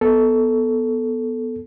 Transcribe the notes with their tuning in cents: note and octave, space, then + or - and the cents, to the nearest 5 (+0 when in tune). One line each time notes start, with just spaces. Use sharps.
B3 +0 A4 -5